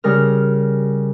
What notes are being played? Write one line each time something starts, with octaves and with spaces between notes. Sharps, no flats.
C#3 G3 A#4 F6